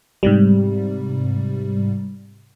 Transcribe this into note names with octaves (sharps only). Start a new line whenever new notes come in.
G#2 C3 G3